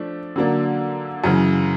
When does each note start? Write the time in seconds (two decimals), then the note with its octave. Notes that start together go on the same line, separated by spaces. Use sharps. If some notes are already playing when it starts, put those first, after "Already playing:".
Already playing: F3 A3 D4
0.36 D3 F#3 A#3 D4
1.24 F#2 C#3 E3